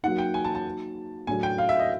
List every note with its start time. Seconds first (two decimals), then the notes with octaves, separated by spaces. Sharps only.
0.03 F#3 A#3 D#4 F#5
0.18 G5
0.34 G#5
0.45 A5
0.55 A5
1.27 A2 F#3 A3 D4 G#5
1.43 G5
1.58 F5
1.69 E5
1.80 D#5